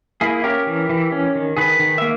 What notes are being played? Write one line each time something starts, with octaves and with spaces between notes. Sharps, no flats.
A#3 E4 G#4
C#4 G4 A#4
E3
E3
C#4
D#3
D#3 G#4 B4
D#3
E5
A#3